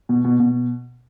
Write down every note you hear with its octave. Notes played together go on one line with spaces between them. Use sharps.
B2
B2
B2